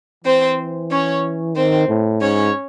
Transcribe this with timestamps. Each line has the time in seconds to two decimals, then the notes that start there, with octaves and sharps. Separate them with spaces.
0.24 E3 C4 C5
0.90 C#4 C#5
1.55 D#3 C4 C5
1.89 A2
2.21 G#2 C#4 C#5